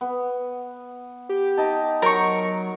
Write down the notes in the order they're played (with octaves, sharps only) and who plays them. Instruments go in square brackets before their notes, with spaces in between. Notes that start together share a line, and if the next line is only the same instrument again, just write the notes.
[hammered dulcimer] B3
[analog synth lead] G4
[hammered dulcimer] D#4 A5
[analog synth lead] F#3 [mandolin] A#4 C#6